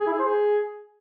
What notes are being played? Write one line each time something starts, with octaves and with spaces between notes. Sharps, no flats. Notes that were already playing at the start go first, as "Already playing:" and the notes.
G#4
E4
G#4
C5
G#4